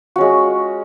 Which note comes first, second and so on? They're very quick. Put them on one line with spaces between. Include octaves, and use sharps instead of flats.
F#4 C#4 G#3